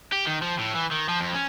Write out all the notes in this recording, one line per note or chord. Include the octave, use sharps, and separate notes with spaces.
G4
D#3
F3
A2
E3
D#3
F3
F2
C#4